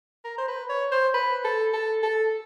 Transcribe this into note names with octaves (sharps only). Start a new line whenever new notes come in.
A#4
C5
B4
C#5
C5
B4
A4
A4
A4